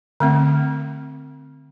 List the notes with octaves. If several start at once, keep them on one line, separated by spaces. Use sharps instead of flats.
D3 A3 C4